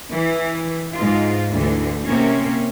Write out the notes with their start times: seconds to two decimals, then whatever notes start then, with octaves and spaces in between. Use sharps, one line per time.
0.12 E3
0.94 G#2 F4
1.53 D2 D3 E3
2.04 C3 A#3 C#4